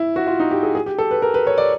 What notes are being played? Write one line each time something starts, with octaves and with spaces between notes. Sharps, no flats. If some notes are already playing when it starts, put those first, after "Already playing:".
Already playing: E4
F#4
F4
D#4
G4
G#4
G#4
G4
A4
B4
A#4
B4
C#5
D5